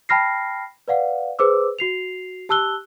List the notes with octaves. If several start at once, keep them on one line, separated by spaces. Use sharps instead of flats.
G5 A5 B5 F6 A#6 C7
B4 D5 F5 F#5
G#4 B4 C5 D6 E6
F#4 C7 F7
G4 A5 E6 F#6 G7